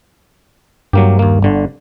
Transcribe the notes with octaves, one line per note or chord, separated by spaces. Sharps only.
G2 F#3 A#3 G4
D#2 A#3
G1 D3